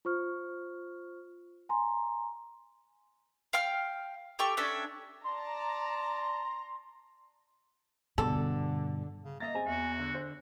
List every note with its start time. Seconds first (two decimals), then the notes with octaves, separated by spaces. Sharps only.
0.05 F4 C5 C#6 F6
1.69 G#5 A#5 C6
3.53 F5 G5 F6
4.39 G4 A4 G5 C#6
4.57 C#4 D4 A4 E5
5.24 D5 A5 A#5 C6
8.18 G2 B2 D3 A4
9.24 C#3
9.40 A#3 D#5 E5 A#5 A6
9.55 C4 G#4 G#5
9.66 E2 F#4 E5
9.99 D3
10.15 C5